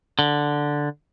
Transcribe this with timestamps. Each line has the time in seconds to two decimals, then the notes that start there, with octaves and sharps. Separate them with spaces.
0.19 D3